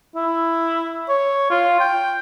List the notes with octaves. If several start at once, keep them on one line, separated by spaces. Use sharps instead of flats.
E4
C#5
F4
G5